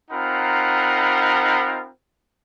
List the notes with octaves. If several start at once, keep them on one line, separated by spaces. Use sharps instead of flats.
C4 D#4 F4 A#4 F#5 B5